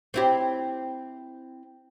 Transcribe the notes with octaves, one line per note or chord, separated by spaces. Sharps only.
C4 E4 G4